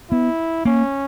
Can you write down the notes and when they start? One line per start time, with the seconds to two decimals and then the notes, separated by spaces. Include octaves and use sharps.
0.11 B3 E4
0.65 A#3 C#4